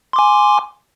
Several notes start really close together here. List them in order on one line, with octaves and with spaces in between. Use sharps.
C6 D6 G#5